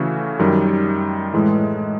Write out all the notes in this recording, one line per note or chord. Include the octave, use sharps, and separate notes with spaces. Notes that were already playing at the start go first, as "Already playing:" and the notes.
Already playing: C#3 E3 A3 C#4 F#4
F#2 D#3 G3
A2 E3 G#3